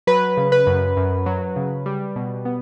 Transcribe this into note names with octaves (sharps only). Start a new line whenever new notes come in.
F#3 B4
C#3
B4
F#2
F#2
F#3
C#3
G3
B2
B3